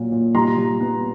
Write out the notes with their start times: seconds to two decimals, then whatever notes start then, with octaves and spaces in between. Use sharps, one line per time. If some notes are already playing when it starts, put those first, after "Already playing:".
Already playing: A#2 F#3
0.12 A#2
0.35 G3 A#5 C6
0.57 G3
0.80 B3